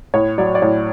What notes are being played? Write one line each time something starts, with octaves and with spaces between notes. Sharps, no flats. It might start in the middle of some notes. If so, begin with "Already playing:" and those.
A2 C#5
F#3 D5
D5
A2 C#5